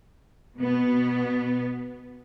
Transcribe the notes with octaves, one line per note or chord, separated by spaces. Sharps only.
B2 B3